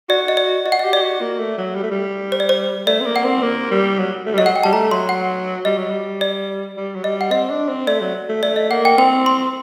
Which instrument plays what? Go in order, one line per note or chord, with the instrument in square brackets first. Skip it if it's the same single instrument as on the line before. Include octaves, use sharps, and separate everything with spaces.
[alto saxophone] F#4 [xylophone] D5
[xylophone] D#5
D5
[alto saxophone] F#4 [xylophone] D#5
[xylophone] F#5
[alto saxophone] G4 [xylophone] D#5
[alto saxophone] G4 [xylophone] D5
[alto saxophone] F#4
A#3
A3
F#3
G3
A3
G3
[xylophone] C5
D5
C5
[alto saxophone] A3 [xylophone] D5
[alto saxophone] C4
A#3
[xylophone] F#5
[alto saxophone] C4
A#3
G3
F#3
A3
G3
[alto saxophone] F#3 [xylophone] D#5
[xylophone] F#5
G5
[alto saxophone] G3 [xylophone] A5
[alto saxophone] A3 [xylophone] A#5
[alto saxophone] F#3 [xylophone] C6
[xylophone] F#5
[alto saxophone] G3 [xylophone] D#5
[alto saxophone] F#3
G3
[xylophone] D5
[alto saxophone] G3
F#3
[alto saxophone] G3 [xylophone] D#5
[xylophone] F#5
[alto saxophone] C4 [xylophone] D#5
[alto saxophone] D4
C4
[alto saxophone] A3 [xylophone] D5
[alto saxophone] F#3
A3
[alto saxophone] A3 [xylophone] D5
[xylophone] D#5
[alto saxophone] A#3 [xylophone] F#5
[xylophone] G5
[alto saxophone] C4 [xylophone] G5
[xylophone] C6